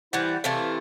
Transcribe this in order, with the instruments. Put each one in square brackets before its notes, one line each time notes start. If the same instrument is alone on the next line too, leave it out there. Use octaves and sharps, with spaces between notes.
[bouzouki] E3 G3 [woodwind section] E4 C5 F#5
[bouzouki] C3 E3 A3 [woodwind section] F5 A5